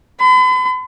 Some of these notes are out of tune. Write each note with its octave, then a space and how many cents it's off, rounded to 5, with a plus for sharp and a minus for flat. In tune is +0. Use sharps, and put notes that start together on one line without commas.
B5 +45